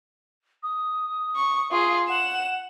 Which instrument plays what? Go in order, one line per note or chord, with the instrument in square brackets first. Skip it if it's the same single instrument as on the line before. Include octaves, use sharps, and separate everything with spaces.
[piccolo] D#6
[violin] C#6
[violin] F4 G#4 [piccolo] D#6
[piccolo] F#5 [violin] E7